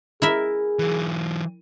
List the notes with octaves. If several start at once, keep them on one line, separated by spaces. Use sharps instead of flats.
E4 G#4 A#4 E5
E3 F#3